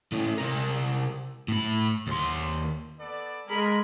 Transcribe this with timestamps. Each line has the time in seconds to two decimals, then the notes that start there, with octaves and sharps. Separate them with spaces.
0.13 E3 C#4
0.38 C3 A#4
1.48 A2 B5
2.08 D#2 C6
2.98 B3 A4 D5
3.48 G#3 G#4 A#4 B5